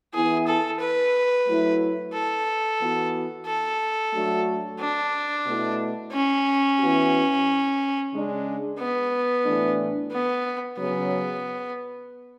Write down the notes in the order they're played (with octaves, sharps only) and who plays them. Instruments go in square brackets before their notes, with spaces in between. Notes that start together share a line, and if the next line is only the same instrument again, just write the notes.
[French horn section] E3 B3 E4 [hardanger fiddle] G#4
[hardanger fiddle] A4
B4
[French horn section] F#3 A3 E4
[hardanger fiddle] A4
[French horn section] E3 B3 F#4
[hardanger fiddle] A4
[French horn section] F#3 A3 D4 F#4
[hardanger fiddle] D4
[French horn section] B2 A3 E4
[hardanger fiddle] C#4
[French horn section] E3 B3 F#4
C#3 G#3 D4
[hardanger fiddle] B3
[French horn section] A2 E3 A3 D4
[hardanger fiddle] B3
[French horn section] C#3 F#3 C#4 [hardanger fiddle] B3